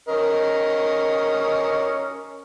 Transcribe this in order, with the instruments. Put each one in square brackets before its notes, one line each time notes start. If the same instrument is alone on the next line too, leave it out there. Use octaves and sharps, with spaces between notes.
[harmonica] C#4 A#4 D#5